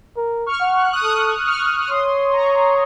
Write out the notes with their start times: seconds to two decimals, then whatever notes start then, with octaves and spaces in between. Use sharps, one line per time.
0.17 A#4
0.46 C#6 F6
0.61 F#5
0.75 F#6
0.93 D#6 F#6
1.04 A4 D#6 F#6
1.47 C#6 F6
1.81 F6
1.90 C#5 C6 D#6
2.33 A#5 C#6